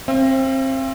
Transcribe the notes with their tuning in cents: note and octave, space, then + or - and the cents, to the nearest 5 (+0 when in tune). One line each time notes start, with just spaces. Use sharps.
C4 +25 F5 -45